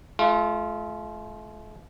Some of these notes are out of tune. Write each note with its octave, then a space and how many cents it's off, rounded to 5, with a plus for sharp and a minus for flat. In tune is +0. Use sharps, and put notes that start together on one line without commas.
A3 -45 F4 -15